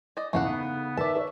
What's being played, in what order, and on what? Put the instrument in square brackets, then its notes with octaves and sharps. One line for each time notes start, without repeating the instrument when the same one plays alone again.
[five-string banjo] D5 D#5
[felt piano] E2 A#2 C#3 [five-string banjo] A3 F5 F#5
[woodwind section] C#3 B3 [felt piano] D#4
[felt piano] D#3 A#4 B4 [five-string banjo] D5 A5 [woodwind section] E5
[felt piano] C#5